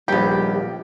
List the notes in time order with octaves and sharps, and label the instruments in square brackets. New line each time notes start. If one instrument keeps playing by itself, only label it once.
[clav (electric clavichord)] A#1 D#2 [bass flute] G3 [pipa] B3 G4